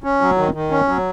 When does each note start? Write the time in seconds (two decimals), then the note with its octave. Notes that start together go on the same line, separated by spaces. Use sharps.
0.04 C#4
0.21 F#3
0.38 D#3
0.54 D#3
0.71 C#4
0.88 F#3